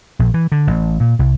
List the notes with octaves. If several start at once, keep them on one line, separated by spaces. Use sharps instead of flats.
A#1
E3
D3
A1
A#2
C2